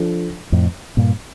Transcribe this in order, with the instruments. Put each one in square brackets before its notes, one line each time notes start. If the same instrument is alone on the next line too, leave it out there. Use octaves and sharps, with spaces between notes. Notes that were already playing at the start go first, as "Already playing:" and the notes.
Already playing: [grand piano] F3 D4 A4
[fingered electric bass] F2 A2
G2 A#2